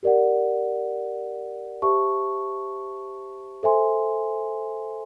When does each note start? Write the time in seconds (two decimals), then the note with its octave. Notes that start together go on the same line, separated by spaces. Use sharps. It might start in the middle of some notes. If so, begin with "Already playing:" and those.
0.03 G4 A#4 D5 F#5
1.82 G4 C5 E5 A5 C#6
3.63 A4 C5 E5 G#5 C6